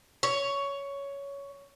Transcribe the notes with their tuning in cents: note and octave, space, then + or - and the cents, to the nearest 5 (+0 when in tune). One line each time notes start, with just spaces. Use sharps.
C#5 +10